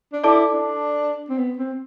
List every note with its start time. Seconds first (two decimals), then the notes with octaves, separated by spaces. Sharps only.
0.13 D4
0.24 E4 A4 D5 A5 D6
0.53 D4
1.29 C4
1.38 B3
1.58 C4